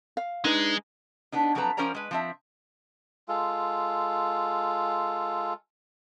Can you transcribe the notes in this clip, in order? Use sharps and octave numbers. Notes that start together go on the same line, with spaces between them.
F5
G#3 D4 D#4 B4
B3 D4 D#4
F3 F#3 C4 A4 B4 A#5
F3 C#4 A#4 C5 D5 A#5
G#3 B4
F3 C4 E5
G#3 F4 A4